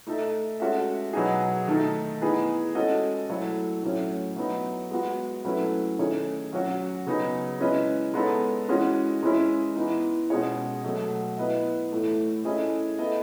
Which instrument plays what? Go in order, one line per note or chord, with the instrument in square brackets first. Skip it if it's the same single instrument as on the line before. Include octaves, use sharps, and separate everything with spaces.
[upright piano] A3 D#4 A4 E5
G#3 C#4 F#4 A4 E5
B2 F#3 B3 D#4 G#4
D#3 A3 D#4 A4
E3 B3 D#4 G#4
G#3 C#4 F#4 A4 D#5
F#3 A3 E4 A4 C#5
A2 F#3 C#4
F#3 B3 D#4
G#3 B3 F#4
F#3 A3 C#4 E4 B4
D#3 A3 C#4 G#4 C#5
F#3 C#4 F#4
C#3 F#3 B3 D#4 G#4
G#3 C#4 E4 B4 D#5
G#3 B3 D#4 A4 C#5
E3 G#3 C#4 F#4
E3 G#3 C#4 E4
E3 B3 D#4
B2 G#3 C#4 G#4 C#5
B2 F#3 A3
B3 E4 B4 D#5
A2 E3 A3
A3 C#4 E4 G#4 D#5
B3 E4 A4 D#5